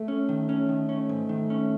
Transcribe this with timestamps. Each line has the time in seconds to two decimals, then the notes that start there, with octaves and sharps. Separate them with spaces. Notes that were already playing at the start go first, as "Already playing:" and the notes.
Already playing: A3
0.08 C#4
0.29 D#3
0.49 C#4
0.69 D#3
0.89 C#4
1.09 G#2
1.29 D#3
1.50 C#4